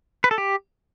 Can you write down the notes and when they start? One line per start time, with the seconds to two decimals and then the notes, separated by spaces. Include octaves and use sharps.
0.24 B4
0.31 A4
0.38 G4